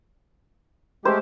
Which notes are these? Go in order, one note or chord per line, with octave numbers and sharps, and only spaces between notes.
G#3 A3 G4 C5